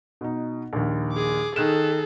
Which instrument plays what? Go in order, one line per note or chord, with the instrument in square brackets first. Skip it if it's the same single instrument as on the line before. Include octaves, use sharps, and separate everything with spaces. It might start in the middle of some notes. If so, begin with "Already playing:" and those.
[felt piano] B2 D#4
A#1 D#2
[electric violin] G#4 D6
[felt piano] D#3 F#6 E7 [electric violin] G#4 A4